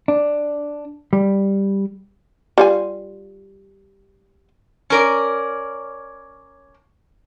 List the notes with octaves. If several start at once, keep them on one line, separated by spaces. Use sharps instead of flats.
D4
G3
G3 F4 G#5
C#4 A#4 D5